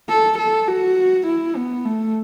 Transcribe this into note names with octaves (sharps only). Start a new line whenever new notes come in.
A4
A4
F#4
E4
B3
A3